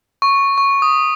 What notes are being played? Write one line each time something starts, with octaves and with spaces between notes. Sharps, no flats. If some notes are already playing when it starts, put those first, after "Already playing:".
C#6
C#6
D#6